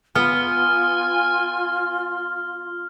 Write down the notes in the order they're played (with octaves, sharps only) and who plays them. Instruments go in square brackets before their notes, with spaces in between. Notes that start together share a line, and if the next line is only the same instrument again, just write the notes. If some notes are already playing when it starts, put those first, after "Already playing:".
[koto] B3 [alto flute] F4 [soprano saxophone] G#5 [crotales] F6